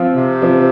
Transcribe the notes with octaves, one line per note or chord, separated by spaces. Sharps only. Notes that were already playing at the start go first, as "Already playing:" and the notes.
Already playing: F3 C4 F4
C3
F3 C4 F4